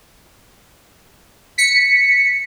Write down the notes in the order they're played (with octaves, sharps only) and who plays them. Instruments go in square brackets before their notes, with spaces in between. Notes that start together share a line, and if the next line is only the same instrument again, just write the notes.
[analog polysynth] B6 C#7